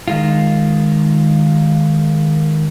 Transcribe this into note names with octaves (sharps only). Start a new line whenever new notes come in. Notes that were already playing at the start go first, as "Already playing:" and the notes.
D#3 G#3 F4